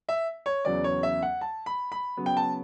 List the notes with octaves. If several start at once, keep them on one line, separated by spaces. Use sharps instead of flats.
E5
C#5
E2 C#3 F#3 D5
C#5
E5
F#5
A5
B5
B5
C#3 F#3 B3
G5
A5